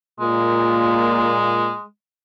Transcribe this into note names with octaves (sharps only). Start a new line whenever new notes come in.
A#2 G#3